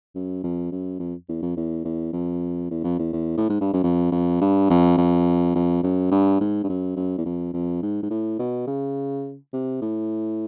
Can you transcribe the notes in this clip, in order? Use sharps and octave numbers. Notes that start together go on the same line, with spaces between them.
F#2
F2
F#2
F2
E2
F2
E2
E2
F2
E2
F2
E2
E2
A2
G#2
G2
F#2
F2
F2
G2
F2
F2
F2
F#2
G2
G#2
G2
F#2
F#2
E2
F2
F2
G#2
G#2
A2
B2
C#3
C3
A2